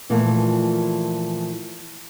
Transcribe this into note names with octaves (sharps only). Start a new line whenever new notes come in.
A#2 E3 F3 A3 A#3